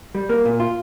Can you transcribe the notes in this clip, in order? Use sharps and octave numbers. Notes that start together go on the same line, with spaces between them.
G3
A#3
A#2
F4